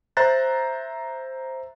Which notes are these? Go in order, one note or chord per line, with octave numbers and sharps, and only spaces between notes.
C5 E5 A#5 F#6 A6